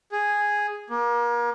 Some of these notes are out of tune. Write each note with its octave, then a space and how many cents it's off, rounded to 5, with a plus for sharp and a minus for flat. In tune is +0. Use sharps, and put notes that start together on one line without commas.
G#4 -5
A#3 +35